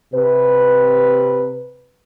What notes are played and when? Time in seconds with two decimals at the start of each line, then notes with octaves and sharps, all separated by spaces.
0.14 C3 B4